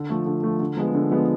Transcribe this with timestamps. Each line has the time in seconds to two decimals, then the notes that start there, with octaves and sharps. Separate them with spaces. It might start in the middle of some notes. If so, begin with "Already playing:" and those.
Already playing: D3
0.10 F3 A3
0.26 D3
0.43 F3 A3
0.60 D3
0.77 F3 G#3 B3
0.95 D3
1.11 F3 G#3 B3